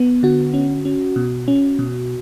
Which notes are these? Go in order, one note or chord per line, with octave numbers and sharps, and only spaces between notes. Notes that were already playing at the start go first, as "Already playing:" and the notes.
Already playing: B3
D3 F#4
C#4
C#4
B2
C#4
B2